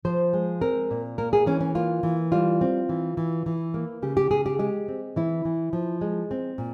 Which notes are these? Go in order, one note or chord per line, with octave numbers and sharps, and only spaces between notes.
F3 C5
G#3
C4 A#4
A#2
A#3 A#4
G#4
E3 C#4
C#4
A#3 F4
E3
G3 F4
C4
E3
E3
E3
A#3
C#3 G4
G4
C#3 G#4
G4
G#3 G4
C4
E3 E4
E3
F3
G#3
C4
A#2